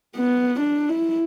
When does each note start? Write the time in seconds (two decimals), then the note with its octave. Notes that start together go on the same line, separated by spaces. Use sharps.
0.16 B3
0.60 D4
0.89 E4